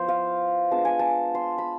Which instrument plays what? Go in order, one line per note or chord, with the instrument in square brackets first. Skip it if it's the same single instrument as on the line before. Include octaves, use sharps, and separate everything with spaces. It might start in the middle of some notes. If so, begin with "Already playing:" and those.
Already playing: [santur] F3 B3 E4 C5
F5
G#3 B3 D4 F4 A5
G#5
A5
C6
B5